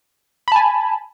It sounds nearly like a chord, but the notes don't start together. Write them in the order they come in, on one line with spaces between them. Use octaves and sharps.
B5 A5 G#5